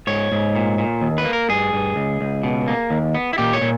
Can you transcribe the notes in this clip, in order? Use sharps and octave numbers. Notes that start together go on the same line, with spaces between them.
G#2 C#5
G#2
A#2
A#2
D#2
B4
A#3
A#4
G2 G#4
G2
C#2
C#2
B2
A#3
D#2
B3
E4
A#2 G4
C#5
A#2